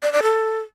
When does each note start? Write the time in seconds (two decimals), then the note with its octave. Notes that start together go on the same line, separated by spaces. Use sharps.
0.03 D5
0.13 D5
0.23 A4